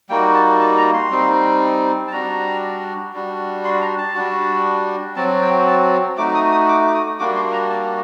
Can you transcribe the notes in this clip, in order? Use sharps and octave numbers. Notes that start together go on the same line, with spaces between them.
G3 A#3 D#4 F#4 G5
A5
A5
A#5
C6
G3 C4 D#4
A5
G3 D4 F#4 A#5
G3 D4 F#4
C6
A#5
A5
G3 D4 F#4
F#3 C4 F#4 A5
G5
A5
A3 D#4 F#4 D6
D#6
D#6
D6
D6
D#6
G3 A#3 D4 F#4 D6
C6
A#5
A5